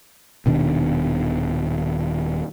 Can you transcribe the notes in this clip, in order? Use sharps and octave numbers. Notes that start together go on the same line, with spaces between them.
D#1 B2 D#3 D4